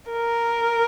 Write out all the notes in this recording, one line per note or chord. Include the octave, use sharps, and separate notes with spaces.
A#4